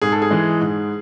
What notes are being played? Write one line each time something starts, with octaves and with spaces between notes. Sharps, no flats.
G#2 G#4
A4
G#4
E3 G#3
G#2